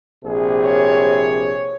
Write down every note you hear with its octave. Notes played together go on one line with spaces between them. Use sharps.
A#1 C3 G#4
C#5